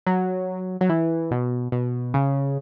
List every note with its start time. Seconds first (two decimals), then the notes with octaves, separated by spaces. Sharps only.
0.06 F#3
0.81 F#3
0.89 E3
1.31 B2
1.72 B2
2.14 C#3